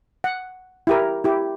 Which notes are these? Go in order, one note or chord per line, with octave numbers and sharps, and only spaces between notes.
F#5
E4 G4 A#4
E4 G4